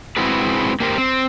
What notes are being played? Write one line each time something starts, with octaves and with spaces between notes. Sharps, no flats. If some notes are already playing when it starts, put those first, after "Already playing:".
G#3 C4 E4 F#4 G#4 B4
A#3 G4 A#4 C5
C4